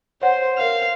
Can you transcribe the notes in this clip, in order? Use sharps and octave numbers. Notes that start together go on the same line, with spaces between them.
C5 C#5 F#5
A#4 F5 F6